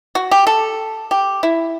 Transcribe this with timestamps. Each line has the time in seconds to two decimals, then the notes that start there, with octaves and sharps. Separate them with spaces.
0.15 F#4
0.31 G4
0.47 A4
1.11 G4
1.43 E4